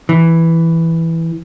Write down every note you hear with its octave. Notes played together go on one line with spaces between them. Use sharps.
E3